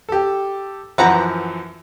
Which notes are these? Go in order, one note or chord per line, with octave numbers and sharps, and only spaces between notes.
G4 A4
F#2 E3 F3 B4 F#5 A#5